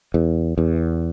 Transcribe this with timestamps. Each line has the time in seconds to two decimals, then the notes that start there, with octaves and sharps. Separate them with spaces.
0.14 E2
0.58 E2